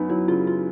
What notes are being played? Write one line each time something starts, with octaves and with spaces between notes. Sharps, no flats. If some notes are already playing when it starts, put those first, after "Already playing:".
Already playing: F#2 B3 D#4
F#3 E4
C#3 F4
F4